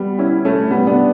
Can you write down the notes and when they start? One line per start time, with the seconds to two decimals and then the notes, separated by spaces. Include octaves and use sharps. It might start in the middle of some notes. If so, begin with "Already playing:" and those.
Already playing: G3 B3
0.19 C#4 E4
0.45 A3 C#4
0.70 G3 B3
0.87 B3 D4